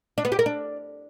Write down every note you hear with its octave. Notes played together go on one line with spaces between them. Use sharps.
D4
B3
G4
A#4
D4